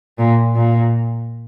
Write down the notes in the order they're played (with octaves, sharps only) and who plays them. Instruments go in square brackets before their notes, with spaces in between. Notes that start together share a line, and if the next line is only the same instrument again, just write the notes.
[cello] A#2
A#2